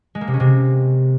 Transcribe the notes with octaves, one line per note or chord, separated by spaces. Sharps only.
G#3
A#3
C3
C#4
C3